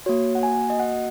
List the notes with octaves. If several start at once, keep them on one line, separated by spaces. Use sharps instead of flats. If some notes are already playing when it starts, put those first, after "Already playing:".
A#3 F#4 C#5
F#5
G#5
D#5
F#5